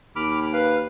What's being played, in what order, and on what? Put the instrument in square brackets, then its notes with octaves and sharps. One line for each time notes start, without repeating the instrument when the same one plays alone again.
[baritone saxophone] D#2 [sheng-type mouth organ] B5 D6 F6
[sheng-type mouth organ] B4 F5